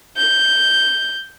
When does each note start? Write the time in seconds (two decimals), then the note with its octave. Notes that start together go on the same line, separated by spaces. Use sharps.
0.17 G6